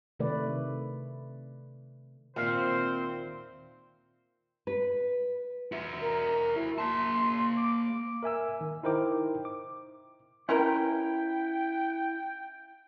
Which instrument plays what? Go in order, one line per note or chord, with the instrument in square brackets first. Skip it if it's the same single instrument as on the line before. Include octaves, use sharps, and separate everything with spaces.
[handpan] C3 D#3 A3 B4 D5
[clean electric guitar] D#2 E5 F5 [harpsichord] A#2 [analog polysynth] C4 [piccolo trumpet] C5
[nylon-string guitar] B4
[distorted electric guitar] F#4 E5
[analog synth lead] A#4
E4
[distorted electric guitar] A#3 A5 [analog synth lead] C6
[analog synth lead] D6
[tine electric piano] A#4 E5 G#5 E6
D#3
D#4 E4 A#4 C5 G5 D6
D6
[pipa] C#4 A#4 B4 [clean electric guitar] E4 [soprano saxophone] G5